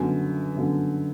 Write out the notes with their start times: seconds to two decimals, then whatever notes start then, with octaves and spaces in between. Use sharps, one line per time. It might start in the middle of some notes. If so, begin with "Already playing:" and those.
Already playing: G1 F#2 D3
0.55 G1 F#2 D3